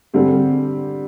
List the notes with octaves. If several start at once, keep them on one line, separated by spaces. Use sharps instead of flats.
D3 G3 C4 G4